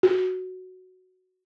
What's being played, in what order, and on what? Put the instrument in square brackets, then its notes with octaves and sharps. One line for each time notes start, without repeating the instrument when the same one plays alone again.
[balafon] F#4